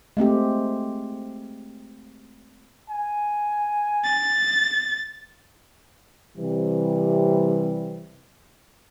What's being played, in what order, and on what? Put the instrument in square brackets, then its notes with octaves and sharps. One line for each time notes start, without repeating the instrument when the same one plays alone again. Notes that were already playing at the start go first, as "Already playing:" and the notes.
[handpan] G#3 A3 C4 G4
[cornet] G#5
[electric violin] A6
[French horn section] C3 E3 G3